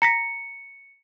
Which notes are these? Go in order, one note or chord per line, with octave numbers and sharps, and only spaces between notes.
A#5 A#6 B6 C#7